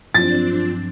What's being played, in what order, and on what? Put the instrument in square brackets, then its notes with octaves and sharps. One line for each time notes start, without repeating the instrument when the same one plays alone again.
[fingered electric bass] G2 F3 F#3 [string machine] C4 D4 [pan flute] F4 [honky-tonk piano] A6